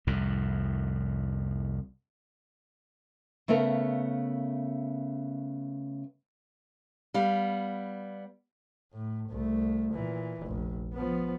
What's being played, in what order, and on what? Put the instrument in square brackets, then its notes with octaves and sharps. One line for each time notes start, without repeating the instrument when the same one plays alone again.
[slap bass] C2 F2 A2
[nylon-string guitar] C#3 A3 B3 A#4 F5
[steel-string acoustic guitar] G3 B3 F5
[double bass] A2
C2 A3
A#2 E3
F1 A#1
F3 B3